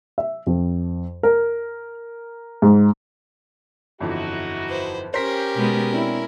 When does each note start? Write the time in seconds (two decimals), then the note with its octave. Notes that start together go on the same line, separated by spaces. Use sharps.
0.18 E5
0.47 F2
1.23 A#4
2.62 G#2
4.01 G1 F2 E3 D#4 E4 F#4
4.68 B4 C5
5.14 C#4 G4 A#4 C5 B6
5.55 B2 G#3 B3
5.92 C4 D4 E4